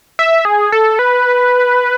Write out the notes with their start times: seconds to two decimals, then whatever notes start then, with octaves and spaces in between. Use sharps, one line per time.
0.19 E5
0.45 G#4
0.72 A4
0.99 B4